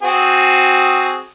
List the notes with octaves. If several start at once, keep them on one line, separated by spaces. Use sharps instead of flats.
C4 F#4 G#4